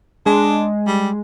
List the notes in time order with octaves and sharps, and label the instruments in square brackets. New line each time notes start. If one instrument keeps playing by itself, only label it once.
[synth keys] G#3 [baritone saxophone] D4
[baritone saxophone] G3